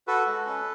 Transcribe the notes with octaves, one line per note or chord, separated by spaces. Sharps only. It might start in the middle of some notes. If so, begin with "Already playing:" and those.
F#4 A4 B4
G#3
C#4